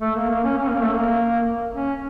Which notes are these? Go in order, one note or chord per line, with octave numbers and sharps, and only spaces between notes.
A3
A#3
A#3
C#4
C#4
A#3
A3
A#3
C#4